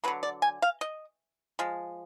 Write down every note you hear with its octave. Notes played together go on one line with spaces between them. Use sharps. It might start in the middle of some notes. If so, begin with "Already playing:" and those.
D3 F#3 A#3 B4
D5
G#5
F5
D#5
F3 G#3